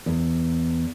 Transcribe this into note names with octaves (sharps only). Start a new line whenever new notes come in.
E2